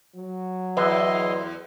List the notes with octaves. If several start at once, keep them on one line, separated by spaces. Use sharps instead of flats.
F#3
E2 E4 B4 D#5 E5 C6